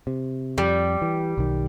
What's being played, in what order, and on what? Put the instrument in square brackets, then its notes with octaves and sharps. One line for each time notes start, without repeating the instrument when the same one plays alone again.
[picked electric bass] C3
[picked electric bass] F2 [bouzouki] G3
[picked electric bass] E3
B1 D#3